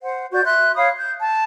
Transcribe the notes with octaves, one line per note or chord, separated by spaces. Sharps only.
C5 F#5
F#4 D5 G6
E5 C6 F#6
C#5 F5 B5 D#6
G6
A5